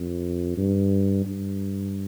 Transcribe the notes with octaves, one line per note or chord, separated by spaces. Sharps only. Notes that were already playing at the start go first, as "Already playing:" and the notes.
Already playing: F2
G2
G2